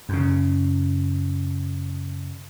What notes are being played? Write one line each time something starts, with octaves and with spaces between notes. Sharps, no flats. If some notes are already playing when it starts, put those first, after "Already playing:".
F#2 C#3